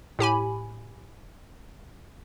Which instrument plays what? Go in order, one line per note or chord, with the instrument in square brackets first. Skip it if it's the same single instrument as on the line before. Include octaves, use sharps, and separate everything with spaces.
[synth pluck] A2 G4 G#5 B5